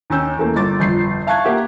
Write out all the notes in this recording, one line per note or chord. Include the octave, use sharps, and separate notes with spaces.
D#2 C#4 E6 G6
E2 A3 A#3
G1 D6 A6
G1 F2 G6 C7
E5 F5 A5 C#6 F#6 G#6
A#3 G4 E5 F#5